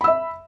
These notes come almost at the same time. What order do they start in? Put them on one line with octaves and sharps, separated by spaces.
B5 E6 E5